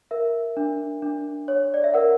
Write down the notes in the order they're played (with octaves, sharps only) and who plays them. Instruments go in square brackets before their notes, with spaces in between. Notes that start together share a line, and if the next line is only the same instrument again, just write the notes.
[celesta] A#4 E5
D4
D4
C#5
D5
E5
A#4 F#5